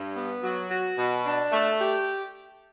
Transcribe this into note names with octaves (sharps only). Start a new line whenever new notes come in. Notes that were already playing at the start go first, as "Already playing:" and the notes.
Already playing: G2
B3
F#3
F#4
B2
D4
A3
G4